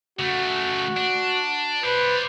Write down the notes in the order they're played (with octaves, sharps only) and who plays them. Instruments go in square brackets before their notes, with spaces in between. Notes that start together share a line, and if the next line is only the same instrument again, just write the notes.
[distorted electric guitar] C#3 A3 [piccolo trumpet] F#4
[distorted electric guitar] D4
[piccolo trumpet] B4 [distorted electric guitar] C5 D5